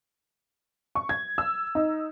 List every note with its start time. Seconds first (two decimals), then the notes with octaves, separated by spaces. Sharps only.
0.95 C#6
1.09 G#6
1.38 E6
1.75 D#4